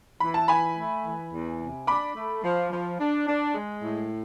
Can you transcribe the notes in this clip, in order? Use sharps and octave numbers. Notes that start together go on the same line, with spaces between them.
E3 B5
A5
E3 G#5 B5
A3
E3
E2
C3
D4 B5 D6
A3
F3
F3
D4
D4
G#3
A2